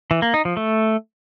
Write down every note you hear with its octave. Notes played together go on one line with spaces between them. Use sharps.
E3
A#3
D#4
F3
A3